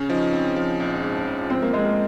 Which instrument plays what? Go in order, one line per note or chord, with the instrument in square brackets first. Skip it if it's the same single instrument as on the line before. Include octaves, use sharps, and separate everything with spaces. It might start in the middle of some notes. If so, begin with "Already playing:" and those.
Already playing: [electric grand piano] C#3 C#4
[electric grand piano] F3 [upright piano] D#4
[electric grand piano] C4
F3
A#1
G#2
A#1
[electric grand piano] F3 [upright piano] C4
[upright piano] A#3
[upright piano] G#3 [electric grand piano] C4
[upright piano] A#3